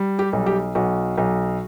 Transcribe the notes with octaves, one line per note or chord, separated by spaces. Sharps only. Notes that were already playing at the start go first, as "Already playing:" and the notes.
Already playing: G3
G4
B1
G4
B1 F#4
B1